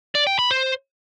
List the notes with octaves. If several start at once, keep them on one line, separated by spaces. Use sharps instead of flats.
D5
G5
B5
C5